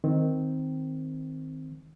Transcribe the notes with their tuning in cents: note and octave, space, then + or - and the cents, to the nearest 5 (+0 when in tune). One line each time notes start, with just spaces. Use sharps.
D#3 +5 C4 -5